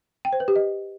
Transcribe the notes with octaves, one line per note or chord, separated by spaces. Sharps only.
G5
C5
B4
G4
D#5